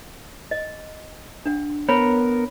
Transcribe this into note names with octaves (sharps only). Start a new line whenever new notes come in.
D#5
D4 F#5
B3 A#4 C#5 B5